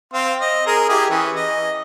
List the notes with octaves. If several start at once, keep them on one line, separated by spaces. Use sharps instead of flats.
C4 F5 C6
D#5
G#4 A#4
E4 G4 G#4
E3 C#4
D#5